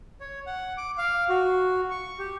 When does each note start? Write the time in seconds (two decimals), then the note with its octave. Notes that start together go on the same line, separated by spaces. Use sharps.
0.21 C#5
0.46 F#5
0.77 D6
0.98 F5
1.29 F#4
1.90 C#6
2.19 G4